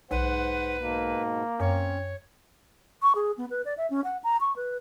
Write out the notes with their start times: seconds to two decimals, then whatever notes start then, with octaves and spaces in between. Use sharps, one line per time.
0.11 B1 G#2 B4 C5 F#5
0.77 G#2 B2 A#3
1.60 F#2 C4 C#4 C#5
3.02 C#6
3.15 G#4
3.38 B3
3.50 B4
3.65 D5
3.77 E5
3.90 C#4
4.04 F#5
4.24 A#5
4.40 C#6
4.56 B4